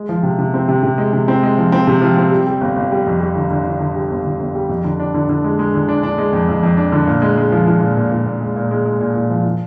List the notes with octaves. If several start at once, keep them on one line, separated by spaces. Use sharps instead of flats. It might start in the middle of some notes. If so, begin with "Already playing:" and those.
Already playing: G#3
F3
C3
C3
C4
C3
C3
G#3
C3
C4
G#3
F3
C4
C3
F3
C4
G3
G3
G1
G1
G3
F2
G3
D3
D3
D3
D3
G3
G1
D3
G1
G3
F2
D3
D4
D3
D3
G#3
G#3
D3
D4
D4
G#3
F2
F2
F2
D4
D3
A#2
G#3
G#3
F3
F3
A#2
A#2
A#2
A#2
G#3
A#2
G#3
G#3
A#2
A#2
F3
F3